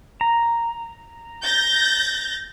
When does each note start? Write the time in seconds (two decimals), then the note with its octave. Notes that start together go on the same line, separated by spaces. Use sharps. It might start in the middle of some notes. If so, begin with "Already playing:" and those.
0.21 A#5
1.44 G6 A6 A#6